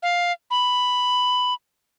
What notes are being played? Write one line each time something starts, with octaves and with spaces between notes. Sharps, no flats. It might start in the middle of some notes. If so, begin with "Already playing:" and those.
F5
B5